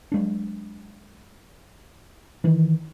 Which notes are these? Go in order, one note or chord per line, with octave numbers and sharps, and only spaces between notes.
F#3 G#3 D4
D#3 E3